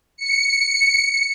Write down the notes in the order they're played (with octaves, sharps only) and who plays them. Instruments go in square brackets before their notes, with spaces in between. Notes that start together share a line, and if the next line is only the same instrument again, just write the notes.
[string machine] C#7